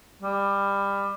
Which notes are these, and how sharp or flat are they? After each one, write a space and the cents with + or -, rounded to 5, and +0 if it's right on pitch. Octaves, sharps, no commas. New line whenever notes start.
G3 +20